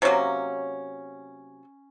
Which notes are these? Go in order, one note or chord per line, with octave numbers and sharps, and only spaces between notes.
C3 F#3 A#3 C#4